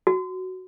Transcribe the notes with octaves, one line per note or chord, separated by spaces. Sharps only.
F#4